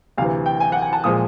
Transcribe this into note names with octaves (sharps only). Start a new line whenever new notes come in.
D2 C3 E3 F5
G5
G#5
F#5
G#5
A5
A#2 F3 G#3 D#6